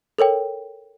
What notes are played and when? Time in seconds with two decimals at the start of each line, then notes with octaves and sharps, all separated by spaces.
0.19 A4 A#4 C#5 G5